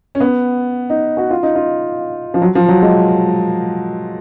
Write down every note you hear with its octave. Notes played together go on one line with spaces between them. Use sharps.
C#4
B3
D#4
F#4
F4
D#4
F4
F3
F#3
F3
F#3
G#3